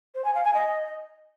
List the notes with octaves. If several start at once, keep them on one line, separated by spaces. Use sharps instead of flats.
C5
G#5
F5
G#5
D#5